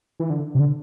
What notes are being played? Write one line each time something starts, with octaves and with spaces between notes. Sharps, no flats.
E3
D3
C3
D3